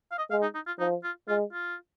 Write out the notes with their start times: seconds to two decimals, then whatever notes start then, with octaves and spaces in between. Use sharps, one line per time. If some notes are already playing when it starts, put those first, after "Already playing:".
0.11 F5
0.18 D#5
0.31 G#3 F5
0.42 D#4
0.55 D#4
0.67 F4
0.79 F3 D#4
1.04 F4
1.28 G#3 F4
1.53 F4